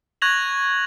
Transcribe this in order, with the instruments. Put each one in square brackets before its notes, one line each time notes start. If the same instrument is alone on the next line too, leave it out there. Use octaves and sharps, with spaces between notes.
[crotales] C#6 F#6 G#6 A#6 F7 F#7